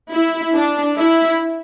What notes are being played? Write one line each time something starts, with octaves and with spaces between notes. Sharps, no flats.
E4
D4
E4